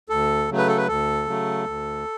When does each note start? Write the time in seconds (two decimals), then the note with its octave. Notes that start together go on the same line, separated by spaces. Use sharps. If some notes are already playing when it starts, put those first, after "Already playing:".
0.09 D2 A4
0.48 C#3 F#3 A3
0.58 B4
0.68 A4
0.77 B4
0.87 D2 A4
1.26 C#3 F#3 A3
1.65 D2